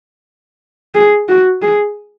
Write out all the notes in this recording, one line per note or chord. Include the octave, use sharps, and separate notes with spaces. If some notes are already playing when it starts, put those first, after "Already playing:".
G#4
F#4
G#4